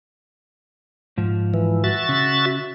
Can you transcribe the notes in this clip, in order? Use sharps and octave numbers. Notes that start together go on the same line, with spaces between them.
G#2 F3
E3
F#4 E5 A6
C#3